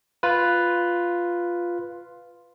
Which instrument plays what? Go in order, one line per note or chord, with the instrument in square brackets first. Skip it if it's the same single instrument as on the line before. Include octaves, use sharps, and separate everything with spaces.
[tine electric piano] F4 B4